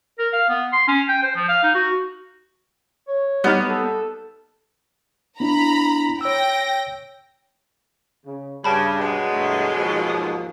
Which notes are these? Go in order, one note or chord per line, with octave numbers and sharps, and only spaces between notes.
A#4
F5
B3
C6
C#4
G5
C5
F3
F5
D#4
F#4
C#5
G3 B3 D#4 F6
A4
B3 D4 E4 A#5 B5
C#5 G5 E6 A#6
C#3
G2 C#3 G3 G5 A5 B5
B2 F#3 G#3
E2 G2 A3
D#2 G#2 F3
D#6